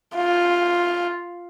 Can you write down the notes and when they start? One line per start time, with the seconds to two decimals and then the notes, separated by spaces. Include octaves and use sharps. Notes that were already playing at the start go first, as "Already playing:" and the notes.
0.17 F4